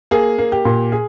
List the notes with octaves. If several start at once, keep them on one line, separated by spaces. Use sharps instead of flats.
A#3 G#4
A#3
G4
A#2
G#4